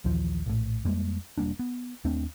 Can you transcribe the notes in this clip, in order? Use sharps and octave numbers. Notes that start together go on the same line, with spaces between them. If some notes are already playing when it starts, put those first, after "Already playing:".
A#1 D#2 E3 F3
A#1 A2
F2 G3 G#3 A#3
E1 G3 A#3 D4
B3
D#2 A3 C4 D4